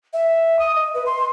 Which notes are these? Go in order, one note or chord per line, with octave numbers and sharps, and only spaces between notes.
E5
D#6
D#5
B4
C6